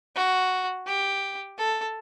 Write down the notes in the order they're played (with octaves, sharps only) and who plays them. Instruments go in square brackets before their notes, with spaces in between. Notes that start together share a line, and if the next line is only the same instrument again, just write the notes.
[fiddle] F#4
G4
A4